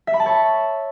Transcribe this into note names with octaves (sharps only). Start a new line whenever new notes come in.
E5
B5
A5
C#5